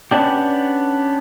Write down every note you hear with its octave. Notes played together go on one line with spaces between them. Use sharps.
B3 C#4 D4 G4